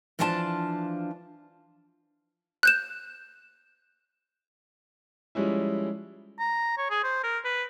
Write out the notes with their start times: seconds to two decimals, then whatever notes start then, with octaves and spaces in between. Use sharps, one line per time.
0.19 E3 F3 D4 F4 G#5 A5
2.63 F#6 G6 E7
5.35 F3 G3 G#3 C#4 E4
6.40 A#5
6.78 C#5
6.90 G#4
7.04 C5
7.24 A#4
7.45 B4